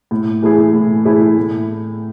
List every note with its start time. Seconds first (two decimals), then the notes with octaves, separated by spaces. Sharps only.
0.11 A2
0.42 E3 A3 E4 G#4
0.73 A2
1.05 E3 A3 E4 G#4
1.37 A2